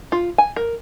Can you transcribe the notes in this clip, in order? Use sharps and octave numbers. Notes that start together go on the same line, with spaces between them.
F4
G#5
A#4